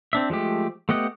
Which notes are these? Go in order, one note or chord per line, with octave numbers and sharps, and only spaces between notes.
C4 D4 E5
F3 G#3 A3 G4
A3 B3 G4 D#5 F#5